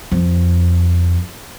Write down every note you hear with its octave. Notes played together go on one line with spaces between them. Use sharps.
F2